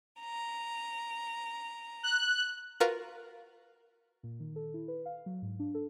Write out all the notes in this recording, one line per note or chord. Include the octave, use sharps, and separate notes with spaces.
A#5
F#6
F4 F#4 A#4 B4 F5
A#2
D#3
A4
E4
B4
F5
F#3
G#2
D4
A4